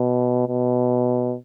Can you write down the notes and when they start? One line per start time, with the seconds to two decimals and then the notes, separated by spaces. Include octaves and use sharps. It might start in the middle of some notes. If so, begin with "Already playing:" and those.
Already playing: B2
0.48 B2